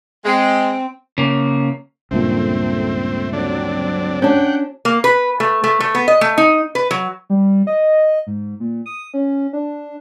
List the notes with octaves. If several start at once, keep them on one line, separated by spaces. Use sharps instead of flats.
G#3 C4
C#3 A#3
C#2 G2 A#2 A3 C4
D3 F#3 C4 D4
C#4 D4 F#5 G5
A#3
B4
A3
A3
A3
B3
D#5
A3
D#4
B4
F#3
G3
D#5
G#2
A#2
D#6
C#4
D4